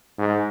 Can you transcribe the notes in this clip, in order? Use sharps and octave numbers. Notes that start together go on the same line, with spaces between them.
G#2